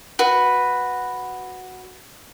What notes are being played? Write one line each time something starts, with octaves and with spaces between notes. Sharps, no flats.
F#4 B4